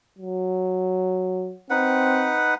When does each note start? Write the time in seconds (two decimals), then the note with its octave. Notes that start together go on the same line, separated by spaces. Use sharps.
0.18 F#3
1.70 C4 D#4 B4 F#5